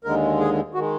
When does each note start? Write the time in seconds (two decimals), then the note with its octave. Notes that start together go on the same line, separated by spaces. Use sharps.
0.04 D#2 D3 G#3 A#4
0.39 G#4
0.74 D#3 G#3 F#4